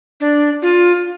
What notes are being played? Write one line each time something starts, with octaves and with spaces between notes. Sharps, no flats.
D4
F4